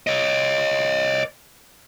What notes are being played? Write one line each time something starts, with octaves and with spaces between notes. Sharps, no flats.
C#5 D#5